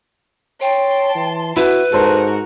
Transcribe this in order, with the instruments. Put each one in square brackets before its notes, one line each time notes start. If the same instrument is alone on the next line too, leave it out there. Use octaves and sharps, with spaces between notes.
[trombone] C#5 [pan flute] G5 [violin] A5 C6
[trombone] E3
[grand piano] E4 [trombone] F#4 [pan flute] B4
[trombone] G#2 [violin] F#4 A#4 [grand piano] A4 C5